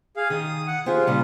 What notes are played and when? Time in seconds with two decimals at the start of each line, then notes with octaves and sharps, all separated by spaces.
0.17 G#4 F5
0.30 D#3 D#6
0.67 F#5
0.86 C4 F4 G4 G#4
1.07 A#2 C#3 G3